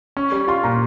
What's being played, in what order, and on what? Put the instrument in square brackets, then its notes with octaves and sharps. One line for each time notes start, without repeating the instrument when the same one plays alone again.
[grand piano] C#4 [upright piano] C#6
[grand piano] G3
[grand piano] F4 [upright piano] C6
[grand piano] A#2 [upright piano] A#5